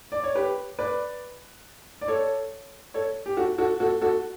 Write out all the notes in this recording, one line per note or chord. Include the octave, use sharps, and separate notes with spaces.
D5
C#5
G4 B4
B4 D5
D5
A4 C#5
A4 C#5
G4
F#4 A4
F#4 A4
F#4 A4
F#4 A4